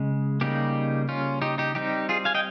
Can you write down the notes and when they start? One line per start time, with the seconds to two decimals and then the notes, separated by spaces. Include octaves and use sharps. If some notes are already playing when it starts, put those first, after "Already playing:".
Already playing: C#3 G#3
0.41 C#3 G3 A#3 D#4 G4
1.09 C#4 F4
1.42 D#4 G4
1.58 D#4 G4
1.75 G3 C4 D#4 G4
2.09 F4 G#4
2.25 F5 G#5
2.35 D#5 G5